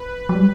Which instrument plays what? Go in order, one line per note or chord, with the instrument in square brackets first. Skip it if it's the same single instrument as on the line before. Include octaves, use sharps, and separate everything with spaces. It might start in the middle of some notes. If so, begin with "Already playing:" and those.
Already playing: [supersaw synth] B4
[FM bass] F#3
G3